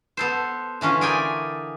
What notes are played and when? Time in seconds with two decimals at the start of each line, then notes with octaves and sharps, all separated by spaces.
0.17 B3 A4 C5
0.81 D3 E3 C#4 F4
1.01 G#4 A#4 D5 G5 G#5